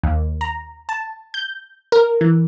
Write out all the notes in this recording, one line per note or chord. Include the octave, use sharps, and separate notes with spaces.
D#2
A#5
A5
G6
A#4
E3